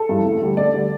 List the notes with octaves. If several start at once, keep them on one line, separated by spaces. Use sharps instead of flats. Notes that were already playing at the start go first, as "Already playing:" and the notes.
Already playing: A4
G2 E3
D2
D3 G3
D2 D5
D3 G3